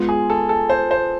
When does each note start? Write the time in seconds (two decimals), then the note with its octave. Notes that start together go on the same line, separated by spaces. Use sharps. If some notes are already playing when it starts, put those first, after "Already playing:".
Already playing: G#3 B3 F4
0.09 G#4
0.30 A4
0.49 A4
0.70 C5
0.91 C5